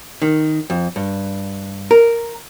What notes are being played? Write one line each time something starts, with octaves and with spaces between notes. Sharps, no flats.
D#3
F2
G2
A#4